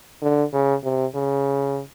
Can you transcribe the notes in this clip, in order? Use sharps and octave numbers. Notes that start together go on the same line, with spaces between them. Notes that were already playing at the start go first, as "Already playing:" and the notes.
D3
C#3
C3
C#3